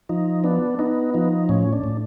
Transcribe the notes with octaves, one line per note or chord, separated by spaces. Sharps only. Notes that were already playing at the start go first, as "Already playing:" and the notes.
F3 D#4
B3 D4
B3 D#4
F3 D#4
A2 C#4
D4
A2